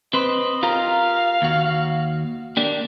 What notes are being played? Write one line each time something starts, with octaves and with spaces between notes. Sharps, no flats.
C4 B4 C5 D#5
F4 G4 A#4 F5
D#2 F#4
A#3 D4 G4